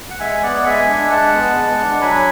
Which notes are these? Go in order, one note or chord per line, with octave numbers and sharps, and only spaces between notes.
F#5
G#3 E5 G#5
B3 D5 F#5
G#3 E5 G#5
D4
G#3 F#5 A5
B3
G#3
D4
F#3 G#5 B5